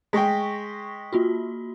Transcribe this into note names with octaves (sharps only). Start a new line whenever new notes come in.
G#3 G5 C#6 A#6 B6
A#3 F4 F#4